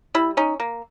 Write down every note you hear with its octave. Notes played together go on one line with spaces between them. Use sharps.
G3 E4
C#4 D#4
A#3